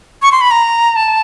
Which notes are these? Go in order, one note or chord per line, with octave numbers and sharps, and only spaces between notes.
C#6
C6
B5
A#5
A5